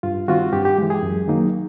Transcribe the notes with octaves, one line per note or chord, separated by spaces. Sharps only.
G2 F4
D#3 G3 C4 F4 F#4
G2 G4
G4
E3 G#3
G#4
F#2
D#3 F#3 A#3 D#4